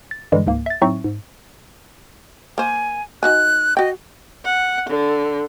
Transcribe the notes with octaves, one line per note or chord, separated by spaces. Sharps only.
A6
G2 D3 E3 G3 G#3
C#2 G#2 A#3
E5 A6
A2 F#3 C4 D#4 E5 C#6
G#2
A#3 C5 G#5
D#4 F#4 G#5 F#6
F#4 D#5 G5
F#5
D3